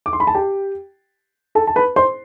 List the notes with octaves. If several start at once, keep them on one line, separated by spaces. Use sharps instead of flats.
D6
C6
B5
A5
G4 G5
A4 A5
A5
B4 B5
C5 C6